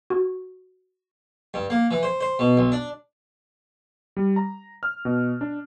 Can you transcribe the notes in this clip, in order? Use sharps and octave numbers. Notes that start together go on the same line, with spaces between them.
F#4
G2
A#3
E3
C5
C5
B2
B1
D4
G3
A#5
F6
B2
D4